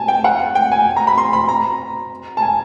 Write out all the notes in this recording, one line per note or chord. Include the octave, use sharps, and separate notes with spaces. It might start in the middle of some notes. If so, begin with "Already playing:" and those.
Already playing: G#5 A5
G5
F#5
G5
G#5
A#5
B5
C6
B5
A#5
A5
G#5